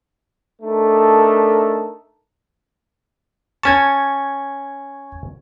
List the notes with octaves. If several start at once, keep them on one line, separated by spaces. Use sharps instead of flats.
A3 D4 D#4 A4 A#4
C#4 A5 C#6 G#6